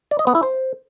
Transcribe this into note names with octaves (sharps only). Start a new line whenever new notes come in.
D5
D#5
B3
E4
C5